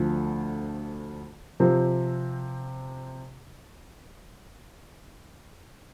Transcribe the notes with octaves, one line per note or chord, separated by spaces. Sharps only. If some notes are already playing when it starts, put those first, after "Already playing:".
Already playing: D2 D3 F3
C3 F3 C4